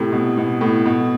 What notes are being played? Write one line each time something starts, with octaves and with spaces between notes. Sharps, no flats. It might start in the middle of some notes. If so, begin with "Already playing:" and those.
Already playing: A2 C3
B2
B2
A2
B2